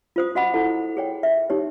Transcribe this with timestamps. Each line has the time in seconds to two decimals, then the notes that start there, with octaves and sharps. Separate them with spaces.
0.16 F4 C5 D#6
0.35 F#4 D#5 F#5 B5 D6
0.54 E4 A4 F#5
0.97 G#4 C#5 G5
1.23 E5
1.50 D#4 G4 C#5